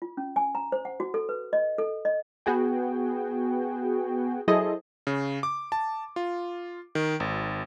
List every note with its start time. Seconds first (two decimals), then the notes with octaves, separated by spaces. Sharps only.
0.02 F4
0.17 C#4
0.36 G#5
0.55 A#5
0.72 C5
0.85 F#5
1.00 F#4
1.14 A4
1.29 B4
1.53 D#5
1.78 A4
2.05 D#5
2.46 B3 F#4 G#4 G5
4.48 F#3 E4 G#4 A4 C5 D#5
5.07 C#3
5.43 D6
5.72 A5
6.16 F4
6.95 D#3
7.20 G#1